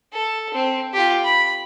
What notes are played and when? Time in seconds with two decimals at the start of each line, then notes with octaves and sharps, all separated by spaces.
0.13 A4
0.54 C4
0.93 F4 G4
1.25 B5